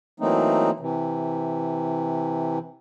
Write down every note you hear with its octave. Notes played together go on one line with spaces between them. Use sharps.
E3 F#3 A3 A#3 C4 D#4
C3 E3